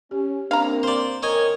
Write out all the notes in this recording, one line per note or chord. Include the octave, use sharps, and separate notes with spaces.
C#4 G4
A#3 C4 D4 F5 A#5
C5 D5
D#3 A#4 C#5 D#5 G#5